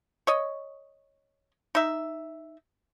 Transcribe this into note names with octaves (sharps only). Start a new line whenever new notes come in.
C#5 D#5
D#4 E5